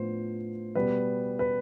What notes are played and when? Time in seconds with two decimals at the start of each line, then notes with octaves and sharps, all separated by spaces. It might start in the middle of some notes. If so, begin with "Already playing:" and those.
Already playing: A2 F3 B3 D4 C5
0.75 B2 G3 B3 B4
1.39 B4